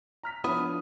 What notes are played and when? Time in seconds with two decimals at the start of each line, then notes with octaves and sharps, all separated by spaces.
0.23 A#5 F6 B6
0.44 F3 B3 D4 E4 B4 C#5 D#6